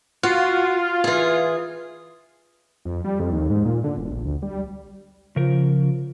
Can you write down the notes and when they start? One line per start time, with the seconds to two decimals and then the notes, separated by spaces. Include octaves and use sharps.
0.23 F4 F#4
1.04 E3 G#4
2.85 F2
3.04 G3
3.20 F2
3.32 D#2
3.50 G#2
3.65 A#2
3.84 D3
3.98 E1
4.11 A#1
4.25 D2
4.42 G3
5.36 C#3 F3 A#4